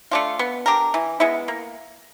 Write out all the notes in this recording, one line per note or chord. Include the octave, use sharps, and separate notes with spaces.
A3 D4 F4
B3
D4 G4 A#4
E3
G#3 B3 E4
A#3